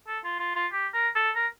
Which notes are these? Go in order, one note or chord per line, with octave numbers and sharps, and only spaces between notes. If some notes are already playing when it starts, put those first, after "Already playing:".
A4
F4
F4
F4
G4
A#4
A4
A#4